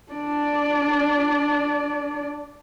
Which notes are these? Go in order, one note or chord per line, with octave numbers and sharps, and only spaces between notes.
D4 D5